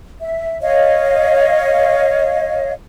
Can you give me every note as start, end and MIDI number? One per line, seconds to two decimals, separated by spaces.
0.20 0.58 76
0.62 2.72 73
0.62 2.72 75
0.62 2.72 77